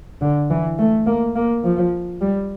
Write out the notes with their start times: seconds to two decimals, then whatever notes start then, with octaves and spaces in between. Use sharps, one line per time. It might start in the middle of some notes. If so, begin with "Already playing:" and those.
0.21 D3
0.50 E3
0.79 A3
1.07 A#3
1.36 A#3
1.64 F3
2.21 G3